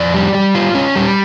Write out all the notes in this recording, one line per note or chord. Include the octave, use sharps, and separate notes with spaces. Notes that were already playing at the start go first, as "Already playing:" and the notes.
Already playing: F2 D5
G3
G3
F4
C#4
G3